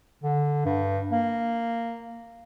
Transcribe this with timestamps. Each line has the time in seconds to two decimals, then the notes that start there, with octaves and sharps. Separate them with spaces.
0.23 D3
0.65 G2
1.12 A#3